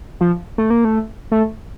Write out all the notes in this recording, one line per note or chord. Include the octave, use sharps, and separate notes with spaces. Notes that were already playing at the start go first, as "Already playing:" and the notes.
F3
A3
A#3
A3
A3